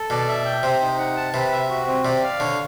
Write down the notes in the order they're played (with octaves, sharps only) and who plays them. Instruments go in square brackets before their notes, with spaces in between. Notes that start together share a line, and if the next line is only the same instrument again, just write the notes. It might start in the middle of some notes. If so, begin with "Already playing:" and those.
Already playing: [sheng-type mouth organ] A4
[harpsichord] B2 [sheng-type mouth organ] D5
[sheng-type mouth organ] E5
G5
[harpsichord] C3 [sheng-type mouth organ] C5
[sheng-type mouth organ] D#4
F#5
A5
[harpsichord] C3 [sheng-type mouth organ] B4
[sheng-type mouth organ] E5
F#4
C4
[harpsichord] C3 [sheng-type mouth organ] D5
[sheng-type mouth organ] F5
[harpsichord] D3 [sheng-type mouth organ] C#5